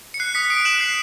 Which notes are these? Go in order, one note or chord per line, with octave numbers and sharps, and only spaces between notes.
C#7
F#6 C7
D#6 B6 C#7
D#6 C7 D7
F#6 E7 F#7
F#6 C7